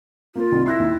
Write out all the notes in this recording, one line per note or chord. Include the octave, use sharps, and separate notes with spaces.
A#3 F4 A#4
C2 D#3
E4 C6 F#6 A#6
D#2